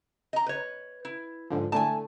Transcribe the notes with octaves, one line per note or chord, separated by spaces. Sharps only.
D#5 A#5
B4 C#5
E4
G#2 D3 F3
A2 D3 A3 G#5 A5